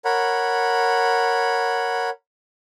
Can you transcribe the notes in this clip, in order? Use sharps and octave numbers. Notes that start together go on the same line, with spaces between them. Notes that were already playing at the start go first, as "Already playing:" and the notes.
A#4 C#5 F#5 B5